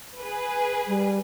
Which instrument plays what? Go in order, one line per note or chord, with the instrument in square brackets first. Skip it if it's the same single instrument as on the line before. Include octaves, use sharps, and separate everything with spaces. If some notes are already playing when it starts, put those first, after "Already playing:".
[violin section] G#4 B4
[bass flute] G3